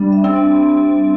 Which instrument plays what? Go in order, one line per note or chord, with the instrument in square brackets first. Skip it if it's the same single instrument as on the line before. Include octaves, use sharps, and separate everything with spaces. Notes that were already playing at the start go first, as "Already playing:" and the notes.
Already playing: [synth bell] G3 [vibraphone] D4
[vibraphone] E5
[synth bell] C4
[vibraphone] D4